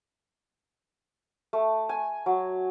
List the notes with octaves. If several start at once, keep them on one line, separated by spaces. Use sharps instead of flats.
A3
G#5
F#3